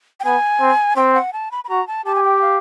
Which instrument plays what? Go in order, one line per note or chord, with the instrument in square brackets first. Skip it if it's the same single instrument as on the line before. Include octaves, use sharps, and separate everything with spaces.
[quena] G5
[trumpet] B3 [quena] G#5
[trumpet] C4
[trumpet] C4 [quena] G5
[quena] F#5
A5
B5
B5
[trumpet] F#4 [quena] A#5
[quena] A5
[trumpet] G4 [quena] A5
[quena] G#5
G5
F5